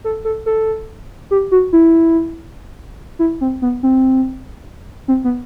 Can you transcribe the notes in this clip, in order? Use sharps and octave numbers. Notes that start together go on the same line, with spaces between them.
A4
A4
A4
G4
F#4
E4
E4
C4
B3
C4
C4
B3